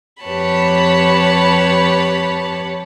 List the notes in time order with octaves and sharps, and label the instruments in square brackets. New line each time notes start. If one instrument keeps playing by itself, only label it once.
[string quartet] F2 G4 B4 C#5 A5 B5